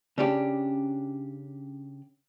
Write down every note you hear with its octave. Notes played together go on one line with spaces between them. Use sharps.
C#3 C#4 D4 G4